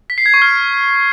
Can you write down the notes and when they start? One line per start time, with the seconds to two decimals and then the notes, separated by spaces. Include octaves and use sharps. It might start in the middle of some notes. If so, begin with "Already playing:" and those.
0.10 B6
0.18 C7
0.26 G#6
0.34 C#6
0.42 F6